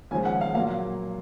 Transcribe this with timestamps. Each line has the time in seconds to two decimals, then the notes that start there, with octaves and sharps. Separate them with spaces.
0.11 D#2 C#3 F3 G#3 G#5
0.25 F#5
0.41 F5
0.55 A#2 F#3 A#3 F5